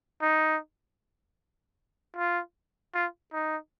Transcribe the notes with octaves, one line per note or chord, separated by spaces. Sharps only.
D#4
F4
F4
D#4